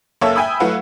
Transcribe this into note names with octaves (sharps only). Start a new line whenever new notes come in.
F#1 A#3 A4 C#5 E5 E6
E5 G5 G#5 B5 D#6
F#3 A3 E4 B4 F5 F#5